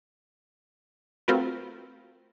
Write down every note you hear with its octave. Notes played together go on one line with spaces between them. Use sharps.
A3 C4 F4 F#4 A#4 B4